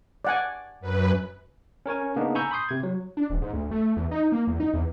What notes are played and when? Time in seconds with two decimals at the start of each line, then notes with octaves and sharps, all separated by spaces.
0.25 D5 F#5 G#5
0.80 F#2 B4
1.86 C#4 A#4 C#5 G#5
2.16 C#3 A#3 B3 D4 D#4
2.35 G#5 A#5 B5 C#6 E6 G6
2.51 B5 C6 D#6 G6 C7
2.69 C3 G#6
2.83 F#3
3.17 D4
3.30 D#1
3.42 G#2
3.53 D2
3.71 A3
3.97 E2
4.11 D#4
4.32 A#3
4.47 E2
4.60 D#4
4.74 E2